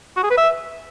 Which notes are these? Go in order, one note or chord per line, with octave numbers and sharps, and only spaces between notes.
F#4
G#4
B4
E5